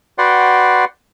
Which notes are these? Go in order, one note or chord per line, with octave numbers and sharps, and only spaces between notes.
F#4 B4 D5 F#5 G5 C6